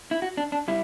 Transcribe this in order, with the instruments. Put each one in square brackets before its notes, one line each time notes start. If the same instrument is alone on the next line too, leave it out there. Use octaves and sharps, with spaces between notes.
[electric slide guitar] E4
F#4
D4
D4
G3 E4